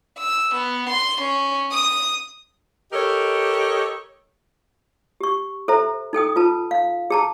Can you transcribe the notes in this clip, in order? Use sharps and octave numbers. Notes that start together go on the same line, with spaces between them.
E6
B3
C6
C#4
D#6
G4 A4 A#4 C#5 D#5
G4 C#6
A4 C5 E5 A#5
D#4 A4 G5 D#6
F4 B4 A5
F5
G#4 A5 A#5